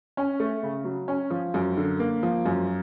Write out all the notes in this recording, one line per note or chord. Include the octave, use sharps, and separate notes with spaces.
C#4
A3
C#3
F#3
C#4
F3
F#2
D3
A#3
F3
F#2